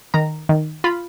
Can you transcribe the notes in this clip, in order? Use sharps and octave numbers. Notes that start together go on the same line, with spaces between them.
D#3 A#5
D#3
F4 B5